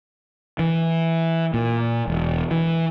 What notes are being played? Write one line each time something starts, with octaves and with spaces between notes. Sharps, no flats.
E3
A#2
E1
E3